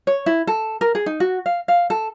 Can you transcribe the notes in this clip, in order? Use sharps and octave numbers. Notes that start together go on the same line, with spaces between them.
C#5
E4
A4
A#4
G#4
D#4
F#4
F5
F5
A4